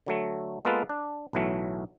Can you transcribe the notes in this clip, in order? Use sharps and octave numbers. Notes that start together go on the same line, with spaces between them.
D3 F#3 A3
G#3 A#3 B3 F4 A4 B4
D4
B1 A2 E3 F#3 A3